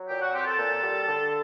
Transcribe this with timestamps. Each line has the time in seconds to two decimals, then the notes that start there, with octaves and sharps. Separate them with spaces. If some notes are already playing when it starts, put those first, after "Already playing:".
Already playing: F#3
0.08 A#2 G4 G5
0.21 F#4 F#5
0.32 C4 G4 G5
0.45 A4 A5
0.58 A#2
0.82 G3
1.07 D3